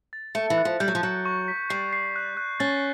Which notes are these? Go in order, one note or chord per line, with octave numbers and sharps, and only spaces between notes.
A6
A3 C#7
E3
F#6
F3
G3 G6
F#3
F3
F#3 G6
C#6
B6
G3 C7
C7
F#6
F#6
C#4 A6